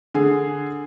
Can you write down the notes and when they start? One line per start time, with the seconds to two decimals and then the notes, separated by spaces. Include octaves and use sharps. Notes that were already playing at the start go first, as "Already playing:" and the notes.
0.14 D3 G#4